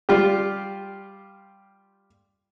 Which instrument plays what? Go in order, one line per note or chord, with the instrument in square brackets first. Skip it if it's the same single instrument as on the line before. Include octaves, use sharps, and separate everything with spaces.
[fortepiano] G3 F4 G4